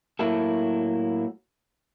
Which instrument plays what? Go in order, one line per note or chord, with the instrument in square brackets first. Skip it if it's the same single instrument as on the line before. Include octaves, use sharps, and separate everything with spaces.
[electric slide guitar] A2 F#3 A#3 E4 F#4 A4